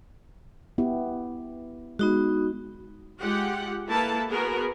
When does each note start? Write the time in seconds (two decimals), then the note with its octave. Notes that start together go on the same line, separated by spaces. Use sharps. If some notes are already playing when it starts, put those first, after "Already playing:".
0.78 B3 E4 G4
1.99 G#3 B3 D#4 F#4
3.21 G#3 F4 G4 F#5
3.90 A#3 E4 A4 B4 A5
4.31 B3 F#4 G#4 A#4